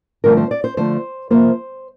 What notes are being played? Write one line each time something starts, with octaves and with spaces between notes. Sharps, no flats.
G2 D3 F3 A3 C4 A#4
C5
D5
C5
D3 F3 A3 C5
C3 F3 A#3 C5